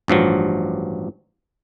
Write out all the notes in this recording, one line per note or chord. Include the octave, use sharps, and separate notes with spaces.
A1 G2 F3 F#3